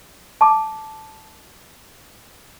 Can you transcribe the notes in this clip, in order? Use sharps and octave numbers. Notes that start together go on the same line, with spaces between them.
A5 D6